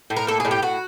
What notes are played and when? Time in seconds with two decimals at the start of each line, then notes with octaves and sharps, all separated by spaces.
0.10 A2
0.17 A#4
0.27 A#3 A4
0.40 A2 G#4
0.51 G4
0.62 A2 F#4